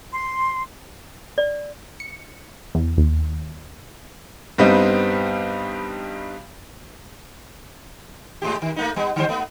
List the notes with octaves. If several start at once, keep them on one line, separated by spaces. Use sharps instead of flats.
C6
D5
C#7
E2
D#2
G2 G3 B3 C4 D#4
G#2 G#3 G4
D#3
A3 A#3 D#4
G3 B3
D3 G3 C5
A3 B3